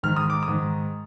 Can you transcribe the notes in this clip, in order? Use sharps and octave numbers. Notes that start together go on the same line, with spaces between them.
G#2 D#3 F6
D#6
D6
D#6
G#2 D#3